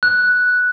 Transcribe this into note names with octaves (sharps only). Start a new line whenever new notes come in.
F#6